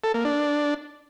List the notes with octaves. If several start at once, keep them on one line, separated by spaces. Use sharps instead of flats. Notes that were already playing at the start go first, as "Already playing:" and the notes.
A4
A#3
D4